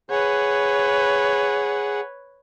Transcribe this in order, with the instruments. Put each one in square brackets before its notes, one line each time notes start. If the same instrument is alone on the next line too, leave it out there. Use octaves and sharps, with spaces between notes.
[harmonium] G#4 F#5 [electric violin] B4 C#5